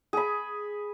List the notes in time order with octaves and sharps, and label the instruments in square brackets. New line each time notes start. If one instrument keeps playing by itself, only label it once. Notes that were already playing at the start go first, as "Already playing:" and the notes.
[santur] G#4 B5